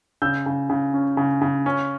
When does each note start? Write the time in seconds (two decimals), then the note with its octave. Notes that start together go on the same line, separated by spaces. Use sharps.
0.22 C#3 E6 G6
0.46 C#3
0.70 C#3
0.94 C#4
1.17 C#3
1.41 C#3
1.66 C#4